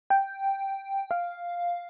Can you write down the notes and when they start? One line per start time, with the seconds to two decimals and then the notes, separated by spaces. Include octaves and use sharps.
0.10 G5
1.11 F5